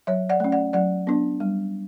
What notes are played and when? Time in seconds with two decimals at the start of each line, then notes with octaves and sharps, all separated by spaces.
0.07 F#3 C#5 E5
0.29 D5 F#5
0.40 A3 C#4
0.52 D5 F#5
0.73 F#3 D5 F#5
1.07 B3 D4
1.40 G3